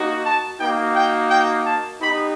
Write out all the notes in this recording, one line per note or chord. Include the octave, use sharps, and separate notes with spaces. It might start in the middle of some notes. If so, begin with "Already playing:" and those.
Already playing: A#3 D#4 F#4
A5
A#3 D#4 F#4 G5
G5
G5
A5
B3 D#4 G4 B5